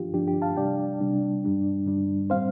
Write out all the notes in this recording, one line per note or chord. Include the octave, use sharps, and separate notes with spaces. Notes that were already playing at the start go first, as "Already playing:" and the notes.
Already playing: G2 F3 D4 F4 G4
G2 F3 D4 G4
G4
F5 A5
C3 G3 D4 D5 G5
C3 G3 D4
G2 G3 D4
G2 G3 D4
A2 G3 C4 C5 F5